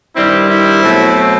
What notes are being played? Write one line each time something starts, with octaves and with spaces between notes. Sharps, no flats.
G2 D#3 G3 C4 E4
E4
B2 F#3 A3 C4